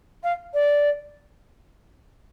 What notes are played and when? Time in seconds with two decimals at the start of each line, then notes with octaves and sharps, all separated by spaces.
0.23 F5
0.53 D5